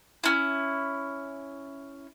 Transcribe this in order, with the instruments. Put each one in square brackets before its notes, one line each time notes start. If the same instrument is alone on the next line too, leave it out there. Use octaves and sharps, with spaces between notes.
[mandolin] C#4 E4